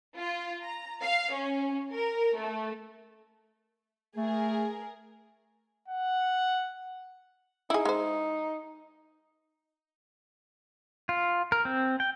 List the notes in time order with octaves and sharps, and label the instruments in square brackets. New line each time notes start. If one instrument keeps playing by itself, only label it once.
[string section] F4
A#5
F5
C#4
A#4
A3
[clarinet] A3 [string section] G#4 A#4
[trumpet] F#5
[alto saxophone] D#4 [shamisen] E4 G#4
[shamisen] G#3 C5
[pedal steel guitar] F4
A#4
C4
G5